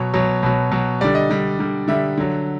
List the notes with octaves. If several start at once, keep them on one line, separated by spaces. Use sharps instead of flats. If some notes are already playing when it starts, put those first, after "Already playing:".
Already playing: B2 F#3 C#5
B2 F#3
B2 F#3
B2 F#3
D3 G3 D5
D#5
D3 G3
D3 G3
D3 G3 E5
D3 F#3